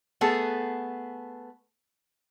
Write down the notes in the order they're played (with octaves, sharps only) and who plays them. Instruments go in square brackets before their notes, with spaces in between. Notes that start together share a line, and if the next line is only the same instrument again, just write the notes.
[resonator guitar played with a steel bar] A3 B3 G#4 A4